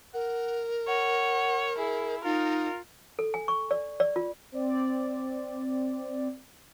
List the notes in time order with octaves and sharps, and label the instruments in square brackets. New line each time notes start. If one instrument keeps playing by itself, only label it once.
[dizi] A#4 [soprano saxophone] F#5
[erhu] C#5 [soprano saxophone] F#5
[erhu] E4 [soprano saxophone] G#4
[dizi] D#4 [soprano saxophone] F4 [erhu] A#4
[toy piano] A4
G#5
C#6
D5
D5
F4
[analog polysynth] C4 D5